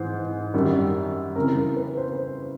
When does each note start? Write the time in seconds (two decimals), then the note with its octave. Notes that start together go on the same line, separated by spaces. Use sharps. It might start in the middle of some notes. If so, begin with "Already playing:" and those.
Already playing: G#2 E3 C5
0.54 F#2 D#3 G3
1.36 F2 C#3 E3 A#4
1.56 A#4
1.77 B4
1.97 C5